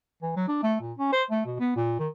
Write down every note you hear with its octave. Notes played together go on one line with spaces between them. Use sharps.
E3
F#3
D4
A3
A#2
C#4
C5
A3
B2
B3
A#2
D#3